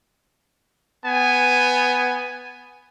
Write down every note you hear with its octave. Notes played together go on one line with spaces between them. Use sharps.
B3 G#5